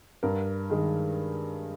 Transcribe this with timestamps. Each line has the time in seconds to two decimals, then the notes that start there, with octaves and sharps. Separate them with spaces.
0.23 G2 A#4
0.70 D#3 G#3